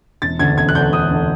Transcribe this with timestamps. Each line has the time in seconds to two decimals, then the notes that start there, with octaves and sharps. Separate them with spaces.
0.22 E1 A6
0.39 D2 D3 G#6
0.57 E1 G#6
0.69 F#6
0.75 D2 D3 G6
0.93 E1 D#6
1.10 D2 D3